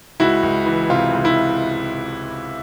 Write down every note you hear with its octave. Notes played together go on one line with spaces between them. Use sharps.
C#2 E4 F#4
C#2
E3
C3 F4
C#2
E4